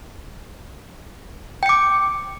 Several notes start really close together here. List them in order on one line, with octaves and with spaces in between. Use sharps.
G5 C#7 D6